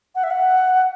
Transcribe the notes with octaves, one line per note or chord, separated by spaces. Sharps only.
F#5
E5
F#5